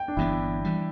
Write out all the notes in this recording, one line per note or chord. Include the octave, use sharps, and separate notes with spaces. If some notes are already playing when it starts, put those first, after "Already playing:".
Already playing: G5
D4
G1 G2 E3 B3 E4
E3 G3